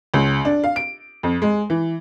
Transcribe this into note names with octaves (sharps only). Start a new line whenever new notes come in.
C#2
D4
F5
D7
F2
G#3
E3